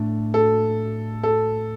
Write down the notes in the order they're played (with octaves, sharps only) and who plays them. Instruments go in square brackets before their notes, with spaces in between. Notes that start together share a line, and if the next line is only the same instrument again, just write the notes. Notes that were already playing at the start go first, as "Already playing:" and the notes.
Already playing: [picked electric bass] A2 A3 D4
[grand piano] A4
A4